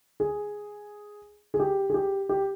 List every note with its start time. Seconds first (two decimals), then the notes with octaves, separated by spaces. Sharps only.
0.20 G#4
1.54 G#4
1.60 G4
1.90 G#4
1.94 G4
2.29 G4